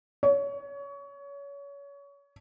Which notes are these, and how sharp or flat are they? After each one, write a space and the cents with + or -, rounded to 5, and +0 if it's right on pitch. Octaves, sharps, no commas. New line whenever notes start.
C#5 +25